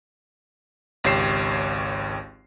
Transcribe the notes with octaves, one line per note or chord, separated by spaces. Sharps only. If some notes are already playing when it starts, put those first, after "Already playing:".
G#1 C#2 G4 C#5 C7 E7